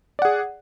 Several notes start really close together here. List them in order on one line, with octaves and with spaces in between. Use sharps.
D5 F#5 G#4